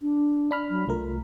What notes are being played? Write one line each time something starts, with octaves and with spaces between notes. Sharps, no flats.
D4
D4 B5 F6
F#3
C2 A3 F4 A#4